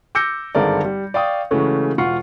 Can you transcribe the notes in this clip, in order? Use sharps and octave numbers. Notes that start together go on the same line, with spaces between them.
D6 E6 G6 A#6 C#7
G#1 G2 D3 G#3 A#4 D5
G3
D5 F5 G5 C#6 D#6
C#3 E3 G#3 A3 C#4 F#4
E1 F4 F#5 C#6 C7